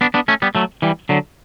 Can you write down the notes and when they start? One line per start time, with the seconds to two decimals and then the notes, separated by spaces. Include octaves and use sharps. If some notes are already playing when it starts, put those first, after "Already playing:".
0.01 B3 D4
0.14 B3 D4
0.28 A3 C#4
0.42 G3 B3
0.55 F#3 A3
0.82 E3 G3
1.09 D3 F#3